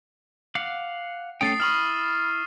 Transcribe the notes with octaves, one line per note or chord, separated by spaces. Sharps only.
F5 F#5 D6
A3 C#4 G5 D#6 A6 C7
E4 B5 C#6 D#6 F6